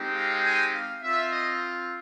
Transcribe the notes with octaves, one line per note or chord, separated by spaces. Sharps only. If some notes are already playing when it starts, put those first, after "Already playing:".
Already playing: G#3 C4 D#4 G4
F5
G#5
F5
C4 F4 E5
D#5